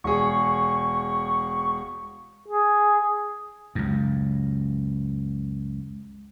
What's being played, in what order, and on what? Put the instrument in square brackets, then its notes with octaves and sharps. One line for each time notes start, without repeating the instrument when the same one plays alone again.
[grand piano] E1 G#4 [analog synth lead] C#6
[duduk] G#4
[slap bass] C#2 F#2